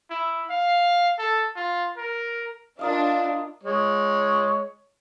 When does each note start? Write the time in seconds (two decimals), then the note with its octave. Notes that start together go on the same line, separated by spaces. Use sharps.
0.10 E4
0.50 F5
1.18 A4
1.56 F4
1.97 A#4
2.79 D4 E4 F4 A#4 D#5 F5
3.63 G#3 C#5